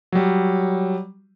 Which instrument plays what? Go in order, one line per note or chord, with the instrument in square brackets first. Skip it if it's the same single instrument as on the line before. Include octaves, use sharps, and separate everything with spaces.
[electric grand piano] F#3 G3